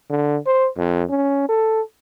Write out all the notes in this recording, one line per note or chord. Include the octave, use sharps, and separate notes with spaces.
D3
C5
F2
C#4
A4